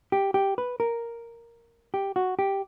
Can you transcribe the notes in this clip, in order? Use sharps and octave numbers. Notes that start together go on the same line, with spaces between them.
G4
G4
B4
A#4
G4
F#4
G4